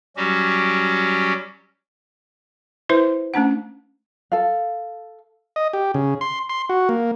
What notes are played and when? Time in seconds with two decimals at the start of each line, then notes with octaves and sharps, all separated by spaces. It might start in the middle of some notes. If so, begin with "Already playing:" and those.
0.17 F#3 G3 C#4 F#4 G4
2.89 E4 B4 C5 E5
3.34 A3 C#4 D4 F#5
4.32 A4 F5
5.56 D#5
5.73 G4
5.94 C#3
6.21 C6
6.49 C6
6.70 F#4
6.89 A#3